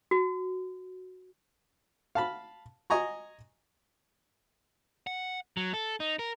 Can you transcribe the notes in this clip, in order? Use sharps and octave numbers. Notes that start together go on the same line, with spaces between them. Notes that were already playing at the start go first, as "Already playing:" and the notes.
F#4
F5 A5 B5
D#5 G#5 A#5 C#6
F#5
F#3
A4
D#4
A#4